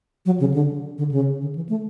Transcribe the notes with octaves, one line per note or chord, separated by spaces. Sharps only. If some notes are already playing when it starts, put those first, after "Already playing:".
F#3
C#3
D3
D3
C#3
D3
E3
A3